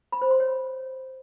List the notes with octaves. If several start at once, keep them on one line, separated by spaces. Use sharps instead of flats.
B5
C5
C6
C#5